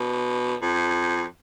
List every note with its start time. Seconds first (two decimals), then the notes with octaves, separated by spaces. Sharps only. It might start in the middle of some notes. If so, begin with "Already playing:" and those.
Already playing: B2
0.62 F2